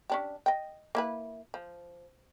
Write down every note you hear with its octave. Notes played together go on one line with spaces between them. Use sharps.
C#4 D4 G4
D#5 G5
A#3 E4 B4
F3